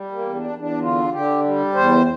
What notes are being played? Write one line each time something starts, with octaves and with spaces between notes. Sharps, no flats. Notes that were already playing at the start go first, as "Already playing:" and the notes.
Already playing: G3
A#3
E2
D4
E2
D4
D3 F4
D3 G4
G3
E2 C5